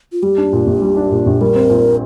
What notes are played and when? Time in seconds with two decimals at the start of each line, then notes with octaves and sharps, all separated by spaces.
0.12 F4
0.22 G3 G4
0.38 D4
0.53 A#2
0.67 A#1
0.82 G3
0.97 D4
1.11 A#2
1.26 A#1
1.41 G3 A#4
1.55 C4
1.70 A#2